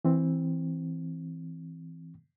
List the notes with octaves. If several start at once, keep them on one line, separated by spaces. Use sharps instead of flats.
E3 C4